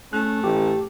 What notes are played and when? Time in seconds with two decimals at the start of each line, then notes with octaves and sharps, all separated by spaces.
0.13 A3 C#4 F#6
0.44 A1 G4